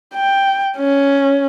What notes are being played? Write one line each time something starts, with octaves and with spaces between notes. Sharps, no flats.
G5
C#4